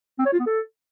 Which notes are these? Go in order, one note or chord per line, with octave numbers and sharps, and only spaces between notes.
C4
C#5
F4
B3
A4